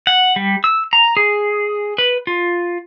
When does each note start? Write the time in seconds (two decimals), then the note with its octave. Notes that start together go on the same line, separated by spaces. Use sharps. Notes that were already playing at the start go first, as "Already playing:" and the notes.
0.07 F#5
0.36 G3
0.64 E6
0.93 A#5
1.17 G#4
1.98 B4
2.27 F4